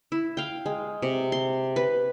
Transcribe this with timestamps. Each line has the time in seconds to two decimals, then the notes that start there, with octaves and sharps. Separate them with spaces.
0.12 E4
0.37 F5 G5
0.66 G#3
1.02 C3
1.32 C6
1.76 B4